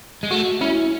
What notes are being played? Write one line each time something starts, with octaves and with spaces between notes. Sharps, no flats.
G#3
A3 F#4
C#4 E4